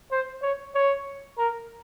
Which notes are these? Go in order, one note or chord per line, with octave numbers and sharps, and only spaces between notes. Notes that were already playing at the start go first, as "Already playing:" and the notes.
C5
C#5
C#5
A#4